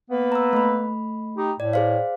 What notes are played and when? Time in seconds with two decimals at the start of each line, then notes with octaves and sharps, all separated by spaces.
0.10 A#3 B3 B4
0.32 A#5 E6
0.53 A3 B5
1.37 D#4 G4
1.60 A2 D5
1.73 G#4 C5 F5